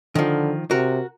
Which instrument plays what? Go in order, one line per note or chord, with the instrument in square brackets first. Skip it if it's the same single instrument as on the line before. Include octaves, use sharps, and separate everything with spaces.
[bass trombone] D3 [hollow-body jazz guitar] D#3 F3
[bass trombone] C3 [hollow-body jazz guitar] F#4 A#4